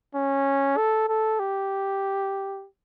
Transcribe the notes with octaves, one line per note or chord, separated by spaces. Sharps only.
C#4
A4
A4
G4